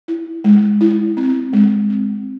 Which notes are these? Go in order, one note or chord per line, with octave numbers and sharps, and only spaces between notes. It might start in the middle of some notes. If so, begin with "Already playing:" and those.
E4
G#3
E4
C4
G#3
C4